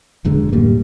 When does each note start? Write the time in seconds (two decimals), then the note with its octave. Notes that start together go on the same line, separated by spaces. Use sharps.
0.25 E1 F#2 D3 G#3
0.52 D#2 A2 G3 A#3